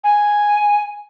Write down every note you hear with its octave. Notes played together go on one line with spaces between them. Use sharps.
G#5